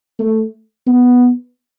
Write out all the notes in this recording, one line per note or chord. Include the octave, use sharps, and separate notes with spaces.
A3
B3